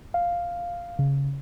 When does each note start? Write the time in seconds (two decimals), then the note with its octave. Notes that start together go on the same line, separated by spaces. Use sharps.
0.14 F5
0.99 C#3